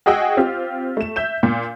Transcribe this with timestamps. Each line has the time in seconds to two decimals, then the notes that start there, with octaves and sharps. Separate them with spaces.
0.06 F#4 G#4 D#5 F#5 G5 E6
0.37 C4 F4 G4
0.97 A3 E7
1.16 E5 G6 E7
1.43 A#2